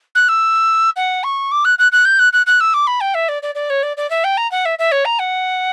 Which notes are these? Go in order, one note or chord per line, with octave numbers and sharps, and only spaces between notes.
F#6
E6
F#5
C#6
D6
F#6
F#6
F#6
G6
F#6
F#6
F#6
E6
D6
B5
G5
E5
D5
D5
D5
C#5
D5
D5
E5
G5
A#5
F#5
E5
E5
C#5
A#5
F#5